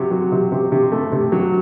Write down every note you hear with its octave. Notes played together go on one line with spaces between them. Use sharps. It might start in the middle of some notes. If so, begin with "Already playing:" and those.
Already playing: C3 F#3
F#3
C3
C3
C3
A3
C3
F#3